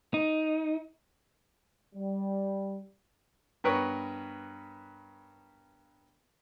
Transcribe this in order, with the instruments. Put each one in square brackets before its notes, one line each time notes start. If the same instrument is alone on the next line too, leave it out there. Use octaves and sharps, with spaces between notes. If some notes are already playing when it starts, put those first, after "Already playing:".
[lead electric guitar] D#4
[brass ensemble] G3
[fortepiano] G2 B3 A#4 B4 C#5